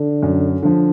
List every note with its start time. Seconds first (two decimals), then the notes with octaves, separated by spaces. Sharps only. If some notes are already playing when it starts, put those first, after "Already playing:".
Already playing: D3
0.23 F#2
0.62 D3 F3